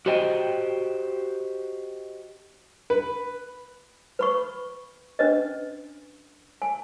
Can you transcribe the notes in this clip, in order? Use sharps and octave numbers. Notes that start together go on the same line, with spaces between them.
F#4 G4 C5 D#5 G5
B4
B4 B5 C#6
C#4 D4 B4 D#5
G#5